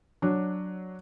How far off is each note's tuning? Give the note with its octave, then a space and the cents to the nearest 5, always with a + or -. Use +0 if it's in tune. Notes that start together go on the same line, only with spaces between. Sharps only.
F#3 +0 D4 +0